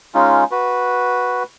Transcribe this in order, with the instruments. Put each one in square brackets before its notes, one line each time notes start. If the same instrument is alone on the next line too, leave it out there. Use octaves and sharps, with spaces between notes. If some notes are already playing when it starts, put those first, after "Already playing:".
[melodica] G#3 C#4 D#4 F4
F#4 B4